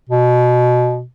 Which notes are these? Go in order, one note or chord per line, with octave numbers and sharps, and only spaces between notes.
B2